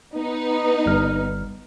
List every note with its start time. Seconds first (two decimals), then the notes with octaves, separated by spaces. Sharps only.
0.14 B3 D#4 B4
0.86 G1 G3 F6